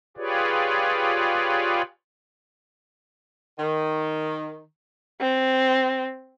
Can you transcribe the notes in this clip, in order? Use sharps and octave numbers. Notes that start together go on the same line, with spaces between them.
F4 G4 G#4 B4 C#5 D5
D#3
C4